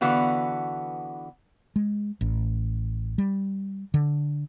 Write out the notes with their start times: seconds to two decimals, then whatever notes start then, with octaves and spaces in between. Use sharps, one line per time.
0.01 D3 E3 B3 F#4 F5
1.76 G#3
2.21 A1
3.18 G3
3.94 D3